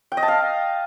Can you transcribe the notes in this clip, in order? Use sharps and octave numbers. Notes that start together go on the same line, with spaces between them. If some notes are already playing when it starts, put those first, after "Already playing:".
G5
D#5
A5
F5